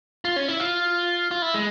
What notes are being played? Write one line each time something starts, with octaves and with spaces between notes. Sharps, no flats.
F4
C#4
E4
F4
F4
E4
G#3